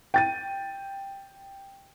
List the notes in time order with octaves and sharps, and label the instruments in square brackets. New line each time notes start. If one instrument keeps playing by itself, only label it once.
[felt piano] G5 A6 D#7